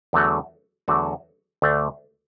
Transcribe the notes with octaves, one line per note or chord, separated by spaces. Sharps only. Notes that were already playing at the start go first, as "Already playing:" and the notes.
E2 D3 F#3 A3 F#4
E2 D3 F#3 A3 F#4
D2 D3 A3 D4